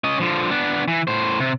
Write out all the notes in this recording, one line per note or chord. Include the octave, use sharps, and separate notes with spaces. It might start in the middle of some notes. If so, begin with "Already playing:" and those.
C#4 D#5
D3 F3
B3 D4
E3
A2 C5
C3